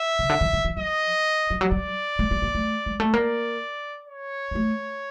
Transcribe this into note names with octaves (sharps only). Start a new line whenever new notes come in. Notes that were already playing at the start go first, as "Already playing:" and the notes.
Already playing: E5
C#3
D3
D#3
D3
E3
F3 D#5
F3
F#3
G3 D5
G#3
A3
A#3
A3
G#3
A3
A#3 D5
C#5
A#3
A3